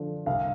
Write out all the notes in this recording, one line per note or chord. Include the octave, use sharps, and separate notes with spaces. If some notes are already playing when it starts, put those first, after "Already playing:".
Already playing: D3 F3
C2 F5